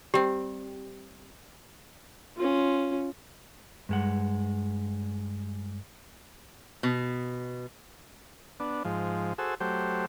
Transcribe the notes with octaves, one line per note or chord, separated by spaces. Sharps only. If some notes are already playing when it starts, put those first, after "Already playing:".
G3 C4 G4
C#4 F4
G2 G#3 F#5
B2
B3 D4
G#2 F3
F#4 G#4 A4 C5 E6
F#3 A3 G4 C5